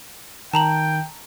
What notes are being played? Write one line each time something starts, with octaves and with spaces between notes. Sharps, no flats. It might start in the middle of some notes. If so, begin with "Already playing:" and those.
D#3 G5 A5 A#5 F#7